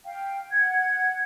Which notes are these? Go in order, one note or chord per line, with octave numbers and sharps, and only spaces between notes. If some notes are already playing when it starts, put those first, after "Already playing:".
F5 G5
F#5 G#6